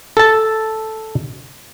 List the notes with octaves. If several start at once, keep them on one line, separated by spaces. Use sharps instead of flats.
A4 A5